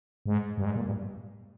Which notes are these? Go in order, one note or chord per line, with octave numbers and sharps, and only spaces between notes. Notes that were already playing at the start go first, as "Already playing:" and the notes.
G#2
G2
G#2
A#2
G2